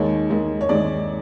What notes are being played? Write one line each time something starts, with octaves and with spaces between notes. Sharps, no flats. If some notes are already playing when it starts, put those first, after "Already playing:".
Already playing: D#2 D#3 G#3 C#5
D#2 D#3 G#3
C#5
D#2 D#3 G#3 D5